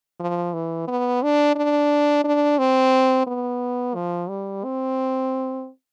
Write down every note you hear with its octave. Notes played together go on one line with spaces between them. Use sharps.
F3
E3
B3
D4
D4
D4
C4
B3
F3
G3
C4